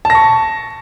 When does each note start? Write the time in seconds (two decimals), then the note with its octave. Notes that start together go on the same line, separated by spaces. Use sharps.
0.05 A5
0.10 A#6
0.15 C#6